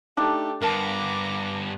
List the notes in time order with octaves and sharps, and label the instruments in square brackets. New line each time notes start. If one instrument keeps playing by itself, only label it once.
[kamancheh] A3 G4 [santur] D4 [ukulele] D#4
[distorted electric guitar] G2 B3 [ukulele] A#4 F5 A5 [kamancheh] A#5 D6